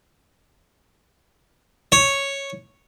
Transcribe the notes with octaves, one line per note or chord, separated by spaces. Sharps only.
C#5